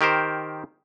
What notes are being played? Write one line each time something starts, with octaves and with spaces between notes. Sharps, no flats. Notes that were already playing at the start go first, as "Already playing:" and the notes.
D#3 G4 A#4 C5